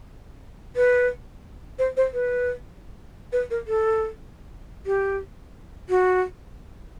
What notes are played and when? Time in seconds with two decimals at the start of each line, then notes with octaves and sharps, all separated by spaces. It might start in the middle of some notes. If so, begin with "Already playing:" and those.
0.76 B4
1.79 C5
1.97 C5
2.14 B4
3.33 B4
3.51 A#4
3.67 A4
4.86 G4
5.90 F#4